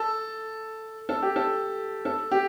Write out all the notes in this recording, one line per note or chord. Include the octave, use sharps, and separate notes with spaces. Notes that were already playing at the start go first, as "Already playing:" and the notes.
Already playing: A4
A4
G4
A4
A4
G4